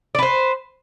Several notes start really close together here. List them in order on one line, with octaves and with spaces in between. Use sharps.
D5 B4 C5